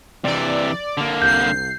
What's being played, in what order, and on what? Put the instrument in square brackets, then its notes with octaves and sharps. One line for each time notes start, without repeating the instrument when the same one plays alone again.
[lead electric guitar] C3 E3 [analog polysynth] D5
[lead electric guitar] D3 A#3
[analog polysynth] C2 C7 [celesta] G6